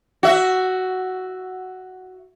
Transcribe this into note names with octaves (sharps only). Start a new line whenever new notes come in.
F#4 E5